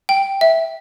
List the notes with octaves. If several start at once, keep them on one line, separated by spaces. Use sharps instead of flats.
G5
E5